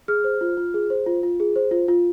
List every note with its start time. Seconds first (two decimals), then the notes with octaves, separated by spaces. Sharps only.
0.08 G#4 F6
0.24 C5
0.41 F4
0.57 F4
0.74 G#4
0.90 C5
1.06 F4
1.23 F4
1.40 G#4
1.56 C5
1.71 F4
1.88 F4